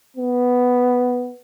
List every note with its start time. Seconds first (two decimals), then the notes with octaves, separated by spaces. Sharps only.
0.17 B3